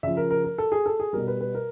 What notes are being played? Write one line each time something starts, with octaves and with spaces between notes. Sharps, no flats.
C#3 F3 E5
A#4
A#4
A#4
A4
G#4
A4
G#4
B2 G3 A#4
B4
B4
A#4